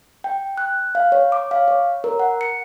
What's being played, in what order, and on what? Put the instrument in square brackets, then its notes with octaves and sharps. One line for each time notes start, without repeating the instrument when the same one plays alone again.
[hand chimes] G5
F#6
F5
C#5
D6
F5
C#5
A#4
F#5
C#7